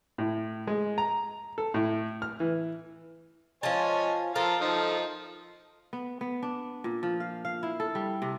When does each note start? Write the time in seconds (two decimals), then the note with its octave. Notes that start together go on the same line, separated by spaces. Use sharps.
0.18 A2
0.67 G#3
0.98 A#5
1.58 A4
1.74 A2
2.22 F6
2.40 E3
3.63 F3 C#5 D#5 G#5 A5
4.36 F3 A4 A#4 F5
4.61 F3 D#4
5.93 B3
6.21 B3
6.43 D4
6.84 A#2
7.03 F3
7.20 F5
7.45 F5
7.63 E4
7.80 A4
7.95 G3
8.22 C3